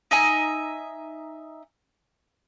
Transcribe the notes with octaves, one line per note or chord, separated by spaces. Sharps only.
D#4 D#5 E5 G#5